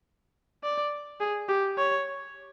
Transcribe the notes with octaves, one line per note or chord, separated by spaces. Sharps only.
D5
G#4
G4
C#5